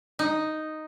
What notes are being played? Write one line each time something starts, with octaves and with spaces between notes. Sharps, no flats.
D#4